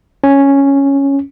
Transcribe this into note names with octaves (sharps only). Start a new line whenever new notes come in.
C#4